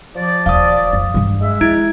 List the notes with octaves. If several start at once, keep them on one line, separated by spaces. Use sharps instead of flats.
F3 D5
D#1 D#2 F5 D#6
F2
G2 G3
G#3 E5
F3 E4 G#6 D7